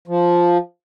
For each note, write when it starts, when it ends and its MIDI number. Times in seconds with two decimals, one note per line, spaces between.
0.08 0.57 53